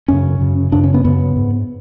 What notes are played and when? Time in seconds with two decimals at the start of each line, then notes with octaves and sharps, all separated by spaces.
0.08 F#2 C#3 C#4
0.40 F#2 C#3
0.72 F#2 C#3 D4
0.84 C#4
0.94 B3
1.05 F#2 C#3 B3
1.36 G#2